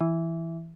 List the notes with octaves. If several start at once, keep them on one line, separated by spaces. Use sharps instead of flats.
E3